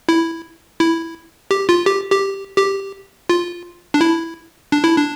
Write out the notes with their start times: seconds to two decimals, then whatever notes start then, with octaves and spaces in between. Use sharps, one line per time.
0.09 E4
0.80 E4
1.51 G4
1.69 F4
1.86 G4
2.12 G4
2.58 G4
3.29 F4
3.94 D4
4.01 E4
4.72 D4
4.84 E4
4.96 D4